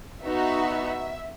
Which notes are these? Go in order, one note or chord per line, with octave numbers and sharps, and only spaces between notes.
B3 D#4 F#4 E5